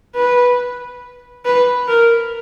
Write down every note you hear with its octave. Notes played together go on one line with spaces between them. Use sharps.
B4
B4
A#4